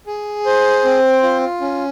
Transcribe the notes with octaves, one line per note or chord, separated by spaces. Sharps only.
G#4
C5
C4
F4
C#4